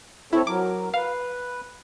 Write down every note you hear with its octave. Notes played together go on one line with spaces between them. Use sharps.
C4 E4 A4 C#5
F#3 A#4 D6
B4 F5